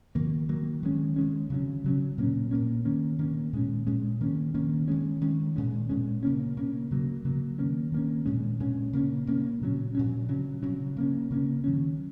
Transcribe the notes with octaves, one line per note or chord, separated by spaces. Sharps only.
D#3 F#3 A#3
D#3 F#3 A#3
D#3 G#3 C#4
D#3 G#3 C#4
C#3 F#3 C#4
C#3 F#3 C#4
A#2 A#3 C#4
A#2 A#3 C#4
D#3 A#3 C#4
D#3 A#3 C#4
A#2 G#3 C#4
A#2 G#3 C#4
D#3 A#3 C#4
D#3 A#3 C#4
D#3 G#3 C#4
D#3 G#3 C#4
A#2 G#3 C#4
A#2 G#3 C#4
C#3 A#3 C#4
C#3 A#3 C#4
C#3 F#3 A#3
C#3 F#3 A#3
D#3 A#3 C#4
D#3 A#3 C#4
A#2 G#3 C#4
A#2 G#3 C#4
C#3 A#3 C#4
C#3 A#3 C#4
A#2 F#3 C#4
A#2 F#3 C#4
C#3 F#3 C#4
C#3 F#3 C#4
C#3 A#3 C#4
C#3 A#3 C#4
D#3 F#3 C#4